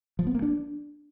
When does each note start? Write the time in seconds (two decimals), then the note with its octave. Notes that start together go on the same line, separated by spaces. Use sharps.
0.19 F3
0.27 B3
0.35 A#3
0.42 D4